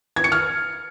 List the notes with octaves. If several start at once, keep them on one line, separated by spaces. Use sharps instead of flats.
G#6
C#7
F6